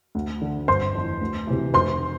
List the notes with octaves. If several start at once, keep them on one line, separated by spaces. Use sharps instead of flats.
D2
D3
G1 C5 C6
F2 E3
D2
C3 E3
F1 C5 C6